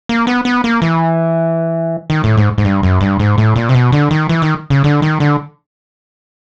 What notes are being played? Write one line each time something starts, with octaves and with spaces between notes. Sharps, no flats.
A#3
B3
B3
A#3
E3
D#3
A2
G#2
G#2
G2
F#2
G2
G#2
A2
A#2
C3
B2
D3
D#3
E3
D#3
C#3
D3
D#3
D3